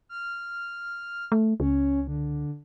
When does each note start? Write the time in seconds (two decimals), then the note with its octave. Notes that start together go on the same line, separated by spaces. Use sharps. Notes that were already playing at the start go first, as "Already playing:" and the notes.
0.09 F6
1.32 A3
1.60 C#2 C#4
2.07 D3